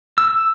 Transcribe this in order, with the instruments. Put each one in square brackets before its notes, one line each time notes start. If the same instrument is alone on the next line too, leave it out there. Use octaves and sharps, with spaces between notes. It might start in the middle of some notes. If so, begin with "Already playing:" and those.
[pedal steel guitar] E6